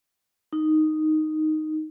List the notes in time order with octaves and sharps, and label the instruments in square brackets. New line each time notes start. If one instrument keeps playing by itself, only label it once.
[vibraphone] D#4